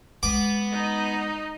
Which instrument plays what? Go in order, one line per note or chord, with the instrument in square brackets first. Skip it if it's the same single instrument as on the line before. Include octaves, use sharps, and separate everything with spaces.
[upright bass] G#3 [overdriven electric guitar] B3 [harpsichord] D6
[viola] D#4 D#5